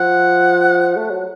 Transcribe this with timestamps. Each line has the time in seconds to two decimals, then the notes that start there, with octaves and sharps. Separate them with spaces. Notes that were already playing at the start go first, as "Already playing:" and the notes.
Already playing: F3 F#5
0.97 A3
1.11 F#3